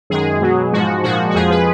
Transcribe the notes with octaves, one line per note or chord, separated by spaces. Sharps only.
F#2 D#3 G#3 G#4
B2 F#3
G#2 F3 G#3 F#4
A#2 F3 G#3 F#4
F#4
F2 F3 G#3 G#4
B4